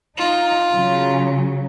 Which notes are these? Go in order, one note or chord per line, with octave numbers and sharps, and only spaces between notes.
D#4 F4
C#3 F#3